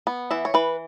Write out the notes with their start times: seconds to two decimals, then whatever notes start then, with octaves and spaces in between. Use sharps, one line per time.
0.07 B3
0.31 E3 E5
0.45 C#5
0.54 E3 B4